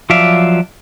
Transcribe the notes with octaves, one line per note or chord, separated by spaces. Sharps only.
F3 F#3 D5 E5 F5